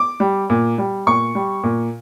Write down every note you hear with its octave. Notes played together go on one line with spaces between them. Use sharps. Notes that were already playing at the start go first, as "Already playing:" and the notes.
Already playing: D6
G3
A#2
G3
A#2 C#6
G3
A#2